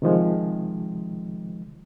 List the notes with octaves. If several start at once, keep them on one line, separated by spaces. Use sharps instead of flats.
C3 D#3 F3 G#3